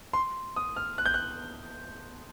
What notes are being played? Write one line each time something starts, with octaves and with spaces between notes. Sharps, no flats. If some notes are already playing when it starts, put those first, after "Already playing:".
C6
D#6
F6
F#6
G6
F#6